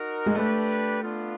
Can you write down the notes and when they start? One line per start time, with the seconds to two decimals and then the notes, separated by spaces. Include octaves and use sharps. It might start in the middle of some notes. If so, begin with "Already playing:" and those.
Already playing: D#4 F#4 A#4
0.26 G#3
0.35 A3 D4 G4 B4
1.03 B3 D4 F4